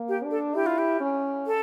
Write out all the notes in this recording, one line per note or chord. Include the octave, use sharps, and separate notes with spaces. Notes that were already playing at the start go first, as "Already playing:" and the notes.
Already playing: A#3
G4
D4
A4
E4 G4
F4
G4
C#4
A4